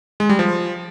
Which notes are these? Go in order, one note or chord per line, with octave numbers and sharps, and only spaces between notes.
G#3
G3
F3